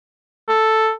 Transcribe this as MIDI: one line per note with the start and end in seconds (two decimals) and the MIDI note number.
0.48 0.91 69